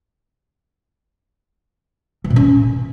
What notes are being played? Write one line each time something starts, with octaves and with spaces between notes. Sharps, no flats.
E3
A#2
C#4